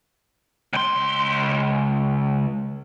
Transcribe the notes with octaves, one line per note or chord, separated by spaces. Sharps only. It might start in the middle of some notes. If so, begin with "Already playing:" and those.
C#2 C6